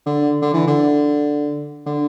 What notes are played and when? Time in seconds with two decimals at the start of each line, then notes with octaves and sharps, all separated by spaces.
0.06 D3
0.42 D3
0.53 E3
0.67 D3
1.86 D3